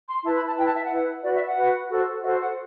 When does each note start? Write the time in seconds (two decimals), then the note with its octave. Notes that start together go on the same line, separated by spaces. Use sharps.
0.09 C6
0.25 E4 B4 A5
0.36 B5
0.47 A5
0.57 E4 B4 G5
0.66 A5
0.74 E5
0.83 F#5
0.91 E4 B4
1.23 F#4 B4 D5
1.34 E5
1.46 F#5
1.57 F#4 B4
1.89 F#4 A4 C5
2.22 F#4 A4 C5 E5
2.40 F#5